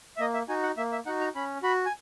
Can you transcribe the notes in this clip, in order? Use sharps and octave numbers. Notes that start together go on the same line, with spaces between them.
E5
A#3 D#5
E5
D#4 F#4 G#5
F#5
A#3 E5
E5
D#4 F#4 F#5
A#5
C#4 B5
F#4 B5
G#5